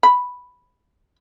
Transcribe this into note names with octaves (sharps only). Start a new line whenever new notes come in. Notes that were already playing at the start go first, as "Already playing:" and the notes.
B5